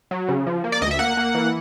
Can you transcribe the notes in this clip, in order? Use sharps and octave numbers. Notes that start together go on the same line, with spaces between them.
F#3
C#3
F3
A#3
D5
D2 D#5
E5
A#3 F#5
A#3
E3